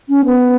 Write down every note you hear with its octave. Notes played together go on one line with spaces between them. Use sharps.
C#4
B3